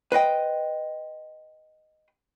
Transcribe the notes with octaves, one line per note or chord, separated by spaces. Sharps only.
B4 C5 D#5 G5